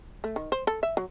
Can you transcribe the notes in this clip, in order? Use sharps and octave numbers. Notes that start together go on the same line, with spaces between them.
A3
D#3
C5
A4
E5
F#3